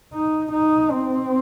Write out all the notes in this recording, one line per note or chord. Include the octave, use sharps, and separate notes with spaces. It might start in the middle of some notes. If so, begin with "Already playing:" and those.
D#4
D#4
C4